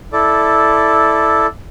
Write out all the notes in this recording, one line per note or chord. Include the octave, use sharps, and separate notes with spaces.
E4 A4 D5